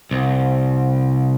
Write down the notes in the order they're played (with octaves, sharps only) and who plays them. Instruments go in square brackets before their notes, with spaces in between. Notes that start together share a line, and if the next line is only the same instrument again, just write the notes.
[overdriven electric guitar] C2